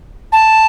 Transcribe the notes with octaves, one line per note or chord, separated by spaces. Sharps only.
A5